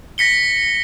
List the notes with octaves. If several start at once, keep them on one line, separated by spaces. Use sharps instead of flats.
A#6 B6 C#7 G7